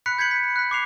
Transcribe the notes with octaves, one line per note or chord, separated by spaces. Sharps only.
B5 F#6 B6 C#7
G6 G#6 B6 C#7 F#7
B6
F#6 B6
D6 C7 F7